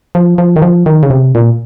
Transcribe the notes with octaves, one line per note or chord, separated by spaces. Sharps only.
F3
F3
D#3
F3
D#3
C#3
C3
A#2